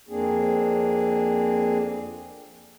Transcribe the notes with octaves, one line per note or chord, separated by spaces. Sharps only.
F2 A#3 C4 D4 G#4